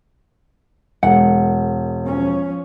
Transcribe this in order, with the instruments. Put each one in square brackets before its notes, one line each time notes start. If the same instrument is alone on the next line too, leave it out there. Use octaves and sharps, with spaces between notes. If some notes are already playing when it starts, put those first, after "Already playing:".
[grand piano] E1 [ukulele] F#5
[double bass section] F3 C#4